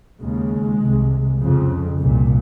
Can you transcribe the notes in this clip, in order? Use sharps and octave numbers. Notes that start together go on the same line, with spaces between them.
D#2 C#3 G#3
C2 C3
F2 C#3
C2 A#2